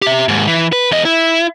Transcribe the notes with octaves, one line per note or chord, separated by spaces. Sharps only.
G4 E5
D#2 G#2
E3
B4
E2 D#5
E4